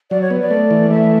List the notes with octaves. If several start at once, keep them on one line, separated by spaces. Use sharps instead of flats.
F#3 D5
C#5
B3
D5
A3
E3
A3 E5